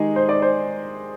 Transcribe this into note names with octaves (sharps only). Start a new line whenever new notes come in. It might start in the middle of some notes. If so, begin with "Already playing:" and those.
Already playing: D#3 G#3 D#4 G4 G#4
C5
D5
C5